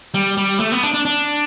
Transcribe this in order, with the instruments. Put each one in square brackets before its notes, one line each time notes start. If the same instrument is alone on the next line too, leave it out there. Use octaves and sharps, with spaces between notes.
[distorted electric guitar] G3
G3
A3
B3
D4
D4
D4